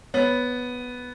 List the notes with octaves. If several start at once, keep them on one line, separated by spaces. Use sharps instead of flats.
B3 C#5